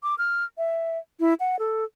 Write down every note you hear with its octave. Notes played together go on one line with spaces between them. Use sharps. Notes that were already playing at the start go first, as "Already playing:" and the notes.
D6
F6
E5
E4
F#5
A4